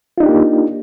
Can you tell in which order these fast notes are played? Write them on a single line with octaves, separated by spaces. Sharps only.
F4 D#4 D4 G4 A#3